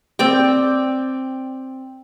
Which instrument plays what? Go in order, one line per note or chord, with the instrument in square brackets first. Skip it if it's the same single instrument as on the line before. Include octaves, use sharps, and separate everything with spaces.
[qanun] C4 D5 G5